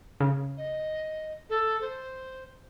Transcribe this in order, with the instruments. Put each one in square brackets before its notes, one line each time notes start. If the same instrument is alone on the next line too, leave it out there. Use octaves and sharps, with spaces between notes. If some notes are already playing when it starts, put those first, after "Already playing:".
[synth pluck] C#3
[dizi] D#5
A4
C5